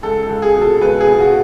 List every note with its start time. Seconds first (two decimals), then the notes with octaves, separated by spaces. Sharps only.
0.02 C#2 A4
0.23 A4
0.29 C#2
0.42 G#4
0.55 B2
0.61 A4
0.81 C#2 B4
1.00 G#4
1.06 B2
1.20 F#4